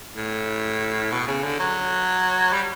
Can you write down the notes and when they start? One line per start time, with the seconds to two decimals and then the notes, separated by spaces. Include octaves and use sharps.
0.16 A2
1.12 B2
1.27 C#3
1.43 D3
1.59 F#3
2.53 G3